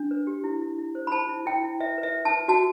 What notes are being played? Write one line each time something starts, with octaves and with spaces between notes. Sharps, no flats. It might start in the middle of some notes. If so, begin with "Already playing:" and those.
Already playing: D4
B4
G4
E4
E4
E4
C5
B5
C5 A5
E4
E4 G5
E4
B4 E5
B4
E5
B4
A5
B4
F#4 A5